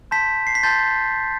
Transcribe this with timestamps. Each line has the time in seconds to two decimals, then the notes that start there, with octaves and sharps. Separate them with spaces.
0.11 A5 C6 G6 B6
0.47 C7
0.55 B6
0.63 A5 C6 G6 A6